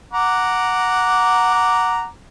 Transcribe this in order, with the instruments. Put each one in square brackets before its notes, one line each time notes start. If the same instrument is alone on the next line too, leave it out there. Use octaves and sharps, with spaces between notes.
[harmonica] F#5 A#5 D6